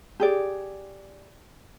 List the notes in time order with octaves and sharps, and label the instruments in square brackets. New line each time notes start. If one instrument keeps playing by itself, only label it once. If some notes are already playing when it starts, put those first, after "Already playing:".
[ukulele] G4 G#4 D5